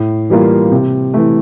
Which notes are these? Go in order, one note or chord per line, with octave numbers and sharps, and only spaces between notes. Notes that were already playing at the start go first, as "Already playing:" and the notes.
Already playing: A2
E3 G3 A#3 F4
C3
E3 A3